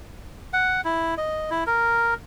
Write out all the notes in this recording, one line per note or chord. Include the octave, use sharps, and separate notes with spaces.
F#5
E4
D#5
E4
A#4